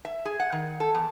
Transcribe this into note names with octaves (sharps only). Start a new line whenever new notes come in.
E5
G#4
F#5
D#3
A4
E2